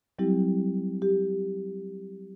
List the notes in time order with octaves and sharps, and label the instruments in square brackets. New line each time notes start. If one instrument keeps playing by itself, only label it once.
[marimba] F#3 G3 C4 E4 G4
G4